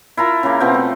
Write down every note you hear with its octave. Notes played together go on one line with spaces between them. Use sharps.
E4 F4 A#4 A5
C#3 A#3
B2 F3 C4 G5
A3